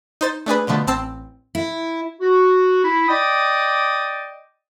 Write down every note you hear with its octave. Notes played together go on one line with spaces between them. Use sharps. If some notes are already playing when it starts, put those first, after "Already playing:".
D#4 C5 A6
A3 D4 G#4 B4
B2 D3 F3 A3
A1 C4 A5 E6 C7
E4
F#4
E4
D5 D#5 G5 D6 D#6